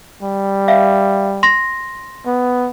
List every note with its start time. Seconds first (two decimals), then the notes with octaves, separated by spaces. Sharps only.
0.22 G3
0.68 E5 F5
1.43 C6 A#6
2.26 B3